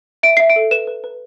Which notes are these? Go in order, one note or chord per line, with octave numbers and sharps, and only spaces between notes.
E5 D7
E5 C7
D7
A4
B4 E7
B4
B4